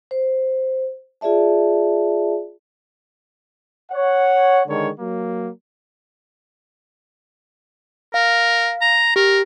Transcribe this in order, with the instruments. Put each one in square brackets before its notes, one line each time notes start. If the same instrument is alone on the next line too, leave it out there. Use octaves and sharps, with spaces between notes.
[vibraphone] C5
F4 G#4 D5 E5 A5
[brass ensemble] C#5 F#5
D3 D#3 G#3 C#5
F#3 A#3
[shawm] A#4 [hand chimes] F5
[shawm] A#5
[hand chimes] G4 [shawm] A#4